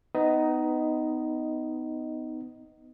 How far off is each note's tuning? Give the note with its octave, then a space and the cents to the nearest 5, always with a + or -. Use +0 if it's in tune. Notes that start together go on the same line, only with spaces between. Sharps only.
B3 +25 D#4 +0 D#5 +0